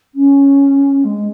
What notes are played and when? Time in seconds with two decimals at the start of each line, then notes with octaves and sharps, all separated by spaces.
0.15 C#4
1.04 G#3